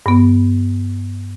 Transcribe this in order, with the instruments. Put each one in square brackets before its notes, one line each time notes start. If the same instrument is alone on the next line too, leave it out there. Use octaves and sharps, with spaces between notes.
[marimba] G2 B3